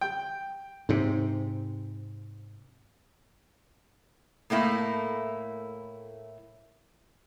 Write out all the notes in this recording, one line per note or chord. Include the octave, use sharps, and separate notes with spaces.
G5
G#2 C3
A2 A3 A#3 E4